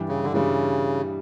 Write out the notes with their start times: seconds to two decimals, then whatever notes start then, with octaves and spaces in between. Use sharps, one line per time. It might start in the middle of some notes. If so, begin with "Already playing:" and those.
Already playing: G2 E3 G3 D4 G4
0.09 C#3
0.24 D3
0.33 G2 C#3 E3 G3 D4 G4